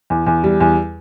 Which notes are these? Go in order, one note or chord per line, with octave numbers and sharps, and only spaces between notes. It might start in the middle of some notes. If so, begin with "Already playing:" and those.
E2
E2
G3
E2